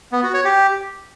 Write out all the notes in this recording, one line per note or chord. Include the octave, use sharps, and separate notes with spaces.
B3
F#4
C#5
G4